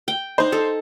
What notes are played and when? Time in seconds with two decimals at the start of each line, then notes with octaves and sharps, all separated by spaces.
0.08 G5
0.38 D4 D#4 C5
0.52 D#4 A4